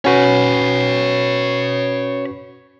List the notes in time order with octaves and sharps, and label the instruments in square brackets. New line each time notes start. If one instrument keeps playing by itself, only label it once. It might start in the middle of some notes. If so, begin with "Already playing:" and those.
[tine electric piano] C#4 F#4 B4 [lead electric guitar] C#5 B5